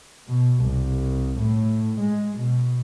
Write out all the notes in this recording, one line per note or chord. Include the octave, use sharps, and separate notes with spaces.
B2
C2
A2
G#3
B2